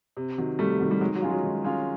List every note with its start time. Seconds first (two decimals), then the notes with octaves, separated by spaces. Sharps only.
0.17 C3
0.38 D#3 F#3
0.59 C3 G3 A3
0.80 D#3 F#3
0.91 G3
1.01 D#3 F#3 G#3
1.15 F#3
1.22 G#3 C#4 F4
1.29 F#3
1.43 D#3
1.64 G#3 C#4 F4